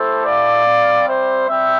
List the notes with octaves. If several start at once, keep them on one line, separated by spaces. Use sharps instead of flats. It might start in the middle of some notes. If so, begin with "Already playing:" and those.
Already playing: A3 E4 G4 A4 C5
D5 F5
G3 C4 G4
C5 E5
G3 C4 E5 G5